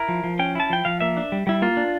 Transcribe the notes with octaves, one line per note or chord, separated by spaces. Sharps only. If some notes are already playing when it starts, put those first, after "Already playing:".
Already playing: E4 A#4
F3
F3
C#4 G5
E4 A5
F3 G5
F3 F5
A#3 E5
D4
G3
G3 E4
A#3 F4
D4